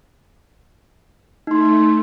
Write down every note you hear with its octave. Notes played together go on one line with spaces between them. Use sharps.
A3 D#4 C6